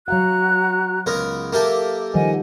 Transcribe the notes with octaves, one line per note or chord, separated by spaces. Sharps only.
F#3 F#4 F5 F#5 A#5 F#6
C#2 B3 A#4
A#3 G4 A4 E5
D#3 F3 G3 D#5 F#5 G#5